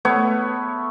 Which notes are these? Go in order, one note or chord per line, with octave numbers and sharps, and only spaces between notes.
A3 B3 C#5